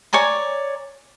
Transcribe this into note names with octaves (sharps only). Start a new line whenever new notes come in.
C#5 D5 G#5 A#5